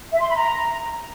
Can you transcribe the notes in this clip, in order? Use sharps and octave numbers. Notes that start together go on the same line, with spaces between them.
E5
C6
B5
A#5